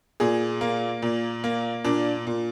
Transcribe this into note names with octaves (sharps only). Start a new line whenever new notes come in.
A#2 G#4
A#3
A#2
A#3
A#2 D4
A#2